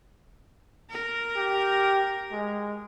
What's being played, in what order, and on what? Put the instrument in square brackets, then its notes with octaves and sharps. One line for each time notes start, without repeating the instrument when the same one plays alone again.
[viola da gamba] A#4
[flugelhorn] G4
G#3